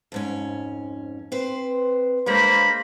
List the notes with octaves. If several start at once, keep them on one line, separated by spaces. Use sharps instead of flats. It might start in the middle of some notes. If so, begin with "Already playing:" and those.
F2 G#2 C#4
C4 B4 C5
G#3 A#3 D4 C5 C#5 B5